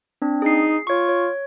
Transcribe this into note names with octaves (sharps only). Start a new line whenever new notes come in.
C4 D4
D#4 G#4 C7
F4 C#5 C#6
C#5